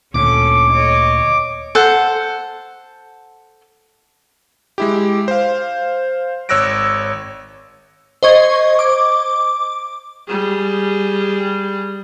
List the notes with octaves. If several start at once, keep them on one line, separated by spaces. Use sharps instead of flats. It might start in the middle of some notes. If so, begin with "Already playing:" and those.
D2 A#2 C#4 A4 D6
C#5 D#5
A4 C5 F#5
G#3 E4 G4
C5 F5
G#1 C#5 E6 F#6 A#6 D7
C5 D#5 C#6 G#6
D6
G3 G#4